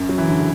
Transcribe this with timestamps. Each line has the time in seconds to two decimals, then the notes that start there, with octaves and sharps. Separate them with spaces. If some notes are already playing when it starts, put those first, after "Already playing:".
Already playing: F#2
0.09 F#3
0.18 E3
0.28 D3
0.38 C#3